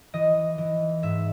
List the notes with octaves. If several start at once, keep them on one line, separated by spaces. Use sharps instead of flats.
E3 D#5
E3
G#2 E5